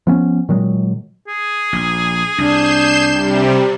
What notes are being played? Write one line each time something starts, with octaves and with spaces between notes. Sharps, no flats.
F3 B3 C#4
A#2 D#3 F#3 G#3
G#4
A#1
C2 D4 G6 C7 E7
C3 G3